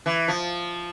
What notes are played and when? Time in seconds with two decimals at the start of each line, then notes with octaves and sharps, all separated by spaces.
0.06 E3
0.28 F3